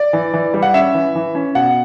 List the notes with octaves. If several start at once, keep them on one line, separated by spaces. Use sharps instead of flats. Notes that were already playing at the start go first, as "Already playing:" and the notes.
Already playing: D5
E3
E3
G3
F#5
C#4 E5
E3
E3
C#4
B2 F#5